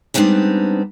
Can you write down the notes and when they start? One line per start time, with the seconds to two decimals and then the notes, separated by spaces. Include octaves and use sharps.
0.14 G3 G#3 B3 C4 D4 D#4